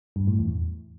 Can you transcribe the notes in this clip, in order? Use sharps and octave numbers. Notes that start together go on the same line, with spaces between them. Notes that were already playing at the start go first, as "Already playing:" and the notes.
G2
A2
E2